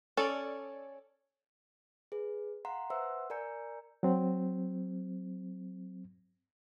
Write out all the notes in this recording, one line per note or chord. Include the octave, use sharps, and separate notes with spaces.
C#4 A4 D5
G#4 B4
F5 F#5 A#5 C6
B4 C5 E5 F#5 C6 E6
A#4 D5 G#5 A#5 G6 C#7
F#3 C4